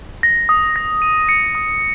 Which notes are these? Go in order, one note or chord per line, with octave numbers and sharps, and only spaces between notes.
A#6
D#6
A#6
D#7
C#7
D#6